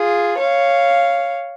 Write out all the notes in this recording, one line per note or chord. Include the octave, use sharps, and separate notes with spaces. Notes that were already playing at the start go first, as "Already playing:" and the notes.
Already playing: F4 G#4
C#5 F5